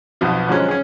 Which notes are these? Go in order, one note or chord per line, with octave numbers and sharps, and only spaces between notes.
B1 F2 B2
D3 F3 F#3 G#3 C#4
C#4 G#4